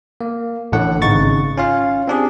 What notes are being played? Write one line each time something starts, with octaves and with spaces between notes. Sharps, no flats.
A#3
A1 A2 D3 F#5
G#1 C#3 D#4 C#6 A6
C#4 F4 F5
C4 D4 G4 G#4